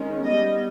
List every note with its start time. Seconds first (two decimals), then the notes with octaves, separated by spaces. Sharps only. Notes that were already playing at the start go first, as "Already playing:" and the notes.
Already playing: D#3 G#3 C#4
0.25 G3 B3 D#5